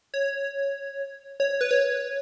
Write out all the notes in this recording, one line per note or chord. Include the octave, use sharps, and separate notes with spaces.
C#5
C#5
B4
C#5